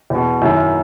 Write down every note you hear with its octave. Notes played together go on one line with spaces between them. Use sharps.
E2 B2
F#2 D#3 E4